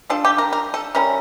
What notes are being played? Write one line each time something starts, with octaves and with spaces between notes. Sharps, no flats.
G3 D4 F4 A4
G4
A#4
A#4
A4
G3 C#4 E4 A#4